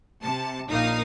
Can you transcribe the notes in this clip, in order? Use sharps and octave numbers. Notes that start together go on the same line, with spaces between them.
C3 A5
A#1 A#2 A#3 D#4 F5 D#6